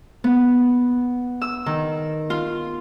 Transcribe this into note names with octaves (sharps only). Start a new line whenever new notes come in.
B3
E6
D#3
F4